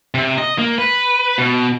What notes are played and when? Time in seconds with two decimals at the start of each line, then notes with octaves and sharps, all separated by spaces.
0.14 C3
0.38 D#5
0.59 A#3
0.78 B4
1.38 B2